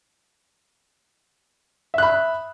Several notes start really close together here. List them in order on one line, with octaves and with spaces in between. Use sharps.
E5 F#6 B5